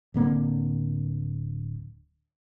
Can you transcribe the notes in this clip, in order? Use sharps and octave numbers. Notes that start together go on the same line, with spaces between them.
D1 D3 A#3 C4